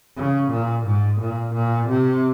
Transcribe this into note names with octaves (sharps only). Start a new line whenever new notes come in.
C#3
A#2
G#2
A#2
A#2
C3